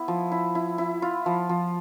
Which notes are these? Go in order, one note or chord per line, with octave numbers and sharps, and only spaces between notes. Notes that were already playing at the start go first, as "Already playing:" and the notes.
Already playing: B3 E4
F3
E4
E4
E4
F4
F3
F3